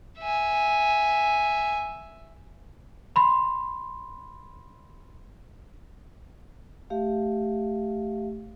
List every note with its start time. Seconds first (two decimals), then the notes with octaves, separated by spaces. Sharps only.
0.19 E5 G#5
3.16 B5 C6
6.90 A3 G4 E5 F5